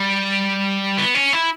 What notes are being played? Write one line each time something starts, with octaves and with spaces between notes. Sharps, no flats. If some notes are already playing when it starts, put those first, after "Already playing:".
Already playing: G3
B3
C#4
E4